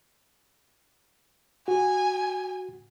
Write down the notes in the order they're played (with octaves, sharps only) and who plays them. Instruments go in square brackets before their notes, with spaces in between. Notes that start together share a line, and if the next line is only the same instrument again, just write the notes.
[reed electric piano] F#4 [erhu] G#5